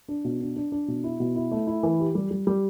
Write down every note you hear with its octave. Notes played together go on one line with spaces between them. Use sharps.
D4
B2
D4
D4
D4
B2
E4
B2
E4
A3
E4
E3
G4
G3
G3
G3